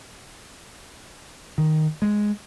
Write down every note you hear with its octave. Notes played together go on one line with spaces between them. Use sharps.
D#3
G#3